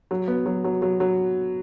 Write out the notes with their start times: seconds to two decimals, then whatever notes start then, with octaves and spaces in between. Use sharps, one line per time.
0.11 F#3
0.28 B3
0.46 F#3
0.64 F#3
0.82 F#3
1.00 F#3